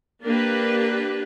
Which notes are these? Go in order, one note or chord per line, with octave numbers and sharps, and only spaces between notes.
A#3 D4 G4 B4